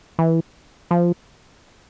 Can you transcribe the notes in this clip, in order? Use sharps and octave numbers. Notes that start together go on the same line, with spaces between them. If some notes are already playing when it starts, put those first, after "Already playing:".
E3
F3